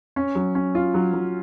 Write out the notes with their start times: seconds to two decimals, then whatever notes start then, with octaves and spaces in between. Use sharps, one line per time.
0.16 C#4
0.35 F#3
0.55 C#4
0.75 F4
0.94 F#3
1.13 F#3